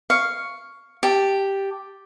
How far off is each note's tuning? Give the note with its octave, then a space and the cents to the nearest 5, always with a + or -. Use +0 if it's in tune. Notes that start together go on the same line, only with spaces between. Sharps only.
F5 +0 C#6 +5
G4 +0 A5 +0